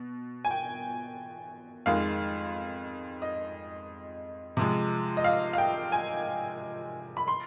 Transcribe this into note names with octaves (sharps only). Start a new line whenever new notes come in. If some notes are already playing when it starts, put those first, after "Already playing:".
Already playing: B2
G#5
G5
F2 D#3 G#3 F5
D#5
C3 F3 G#3
D#5
F5
F5
G5
G#5
B5
C6